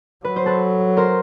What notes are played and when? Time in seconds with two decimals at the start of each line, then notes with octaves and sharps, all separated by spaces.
0.25 F#3 B4
0.36 C5
0.46 A4 B4
0.97 A#4 C5